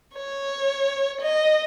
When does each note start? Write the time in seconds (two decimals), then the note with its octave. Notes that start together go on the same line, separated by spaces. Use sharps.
0.16 C#5
1.21 D#5